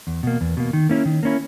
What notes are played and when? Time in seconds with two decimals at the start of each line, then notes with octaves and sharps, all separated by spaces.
0.07 E2
0.23 B2 A#3
0.41 E2
0.57 B2 A#3
0.73 D#3
0.89 A#3 C#4 E4
1.06 D#3
1.23 A#3 C#4 E4